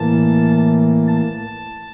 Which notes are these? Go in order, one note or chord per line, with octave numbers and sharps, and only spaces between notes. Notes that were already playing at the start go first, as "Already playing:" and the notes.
Already playing: A2 E3 A#3 A5
A5